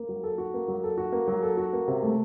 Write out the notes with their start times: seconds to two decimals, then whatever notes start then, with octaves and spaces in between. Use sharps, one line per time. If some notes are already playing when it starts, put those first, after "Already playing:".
Already playing: A#3
0.09 F#3
0.23 A4
0.38 F#4
0.54 A#3
0.68 F#3
0.84 A4
0.98 F#4
1.12 A#3
1.28 F#3
1.43 A4
1.57 F#4
1.73 A#3
1.88 C3
2.03 A3